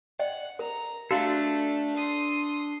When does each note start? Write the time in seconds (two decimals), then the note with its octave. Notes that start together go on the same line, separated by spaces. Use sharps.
0.19 D5 D#5 F#5 G5
0.59 A#4 A#5
1.11 A3 D4 F#4 A4 F5 A5
1.95 C6 D#6